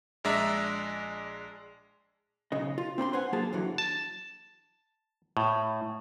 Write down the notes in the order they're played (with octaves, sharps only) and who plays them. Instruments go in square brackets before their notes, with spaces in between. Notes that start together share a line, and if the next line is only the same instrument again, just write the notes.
[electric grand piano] A#1 G#3 D4 D5 E5 A#5
[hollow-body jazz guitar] B1 C#3 D#5
F4
C4 D4 B5 C6
B4 C5 F#5 G#5
F#3 A#3 F4 G#4 A5
G2 D3 E3 F#3
[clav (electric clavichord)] A5
A2